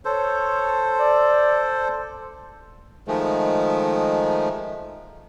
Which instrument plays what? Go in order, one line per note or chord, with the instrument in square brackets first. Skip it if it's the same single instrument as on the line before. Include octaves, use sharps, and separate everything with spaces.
[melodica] A4 C5 [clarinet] C#5
[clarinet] D5
[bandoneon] D#3 F3 G#3 A3